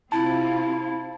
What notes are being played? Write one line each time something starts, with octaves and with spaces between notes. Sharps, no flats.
C3 C4 E4 F4 A5